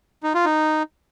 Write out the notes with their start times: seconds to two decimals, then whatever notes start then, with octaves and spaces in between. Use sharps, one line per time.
0.23 D#4
0.34 F4
0.45 D#4